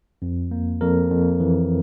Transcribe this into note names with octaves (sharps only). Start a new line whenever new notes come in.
F2
A#3
F2 A#4
F2
E3